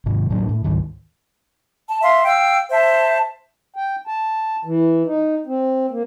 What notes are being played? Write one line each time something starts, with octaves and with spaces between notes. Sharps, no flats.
G#2 C3 D#3
A2 F#3 A#3 D4
A2
C#2 G#2 D#3
A5
E5 F5 C6
F5 G5 E6
C5 E5 A5
G5
A5
E3
D#4
C4
A#3